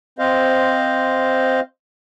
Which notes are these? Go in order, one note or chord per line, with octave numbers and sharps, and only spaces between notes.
C4 C5 D#5 F5